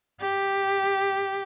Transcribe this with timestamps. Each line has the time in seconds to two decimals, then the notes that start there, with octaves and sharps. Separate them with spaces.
0.20 G4